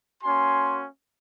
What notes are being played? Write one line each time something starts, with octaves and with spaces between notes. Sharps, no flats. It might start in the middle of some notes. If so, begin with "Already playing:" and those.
A#3 C#4 F#4 G#5 C6